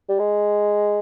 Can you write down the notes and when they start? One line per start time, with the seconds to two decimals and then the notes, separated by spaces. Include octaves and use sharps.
0.09 G3
0.19 G#3